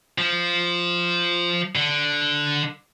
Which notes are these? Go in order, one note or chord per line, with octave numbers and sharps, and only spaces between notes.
F3
D3